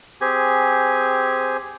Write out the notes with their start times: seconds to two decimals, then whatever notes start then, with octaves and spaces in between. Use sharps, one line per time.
0.21 C4 G4 G#4 G#5